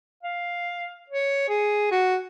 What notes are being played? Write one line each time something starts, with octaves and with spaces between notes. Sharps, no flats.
F5
C#5
G#4
F#4